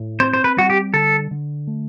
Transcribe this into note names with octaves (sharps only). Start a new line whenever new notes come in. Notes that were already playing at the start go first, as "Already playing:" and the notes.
Already playing: A2
C4 C5
C5
B4
G3 F#4
G4
D3 A4
D3
A3